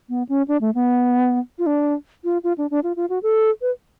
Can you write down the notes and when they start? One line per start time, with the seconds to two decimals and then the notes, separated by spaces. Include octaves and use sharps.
0.09 B3
0.29 C#4
0.48 D4
0.61 A3
0.75 B3
1.59 F4
1.66 D4
2.24 F4
2.44 F4
2.58 D4
2.71 D4
2.84 F4
2.97 F4
3.10 F#4
3.23 A4
3.62 B4